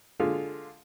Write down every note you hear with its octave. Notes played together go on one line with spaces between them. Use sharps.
D3 G#3 F4 G#4